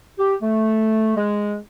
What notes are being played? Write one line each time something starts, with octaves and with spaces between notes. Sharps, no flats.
G4
A3
G#3